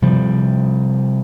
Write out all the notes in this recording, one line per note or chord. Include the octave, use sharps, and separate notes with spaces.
C3 F3 G3